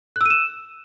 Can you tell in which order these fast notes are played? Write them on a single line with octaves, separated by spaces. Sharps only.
F#6 E6 D#7 E7